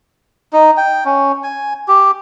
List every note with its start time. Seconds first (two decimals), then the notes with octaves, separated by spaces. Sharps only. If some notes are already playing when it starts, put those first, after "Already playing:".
0.53 D#4
0.77 G5
1.05 C#4
1.44 G#5
1.88 G4